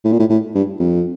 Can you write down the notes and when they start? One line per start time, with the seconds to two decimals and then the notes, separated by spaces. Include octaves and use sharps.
0.05 A2
0.12 A#2
0.19 A2
0.29 A2
0.55 G2
0.80 F2